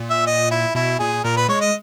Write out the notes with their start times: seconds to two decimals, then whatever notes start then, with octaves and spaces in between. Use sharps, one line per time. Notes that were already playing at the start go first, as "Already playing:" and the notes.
Already playing: A#2
0.10 E5
0.27 D#5
0.51 E4
0.75 B2 E4
0.99 A#2 G#4
1.24 A#2 A#4
1.37 B4
1.49 G#3 C#5
1.61 D#5